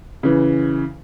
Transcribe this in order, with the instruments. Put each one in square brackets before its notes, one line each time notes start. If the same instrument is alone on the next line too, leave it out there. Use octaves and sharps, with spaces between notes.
[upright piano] C#3 E3